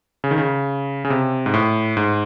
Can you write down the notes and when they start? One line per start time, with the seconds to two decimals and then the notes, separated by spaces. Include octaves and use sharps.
0.24 C#3
0.31 D#3
0.38 C#3
1.05 C#3
1.10 C3
1.46 G#2
1.54 A2
1.97 G#2